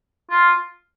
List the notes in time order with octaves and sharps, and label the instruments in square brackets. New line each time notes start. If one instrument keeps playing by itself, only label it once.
[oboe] F4